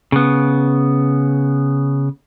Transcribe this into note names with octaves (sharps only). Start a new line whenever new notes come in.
C#3 B3